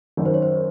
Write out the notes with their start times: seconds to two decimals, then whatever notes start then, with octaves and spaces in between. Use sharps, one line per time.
0.17 G#1 F#2 D#3
0.25 C5
0.34 C#5
0.42 C5